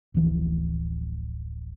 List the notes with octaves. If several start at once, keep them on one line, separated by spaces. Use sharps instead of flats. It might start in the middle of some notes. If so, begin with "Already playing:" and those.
D1 A1 E3 F3